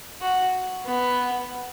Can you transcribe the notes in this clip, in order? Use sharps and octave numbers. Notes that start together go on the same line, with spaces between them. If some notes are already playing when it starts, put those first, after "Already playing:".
F#4
B3